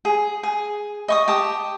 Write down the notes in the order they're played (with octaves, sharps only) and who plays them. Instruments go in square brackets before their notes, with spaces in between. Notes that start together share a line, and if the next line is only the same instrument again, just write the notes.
[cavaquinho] G#4
G#4
D#5 C#6 D#6
G4 A5 D#6